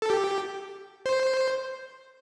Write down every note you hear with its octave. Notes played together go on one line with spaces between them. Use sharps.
A4
G4
C5